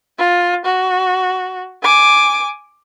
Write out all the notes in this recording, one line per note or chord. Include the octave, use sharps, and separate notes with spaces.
F4
F#4
G#5 D6